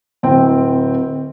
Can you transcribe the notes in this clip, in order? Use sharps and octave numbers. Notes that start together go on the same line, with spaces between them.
D1 C4 G5